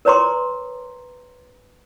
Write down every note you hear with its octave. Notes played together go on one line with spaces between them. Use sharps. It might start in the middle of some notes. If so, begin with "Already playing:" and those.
A#4 B4 C#5 A#5 C6 D6